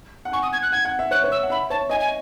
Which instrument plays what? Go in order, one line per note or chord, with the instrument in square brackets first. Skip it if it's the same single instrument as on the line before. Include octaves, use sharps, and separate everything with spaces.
[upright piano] F#5
[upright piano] G#5 [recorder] C#6
[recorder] D#6
G#6
F#6
[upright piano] F#5 [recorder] G#6
[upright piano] F#5
E5
[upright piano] C#5 [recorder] F#6
[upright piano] C#5
[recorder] E6
[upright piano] F#5
[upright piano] E5 [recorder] B5
[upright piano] C#5 [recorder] A5
[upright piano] D#5 [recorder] G#5
[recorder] G#5